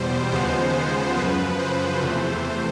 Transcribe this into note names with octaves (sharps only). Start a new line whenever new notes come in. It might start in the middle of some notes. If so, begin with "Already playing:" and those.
Already playing: E2 B2 G3 C5
D#2 C#3 F3 G#3 B3 C5
F#2 C#3 F3 B4
C5
E2 C3 E3 A3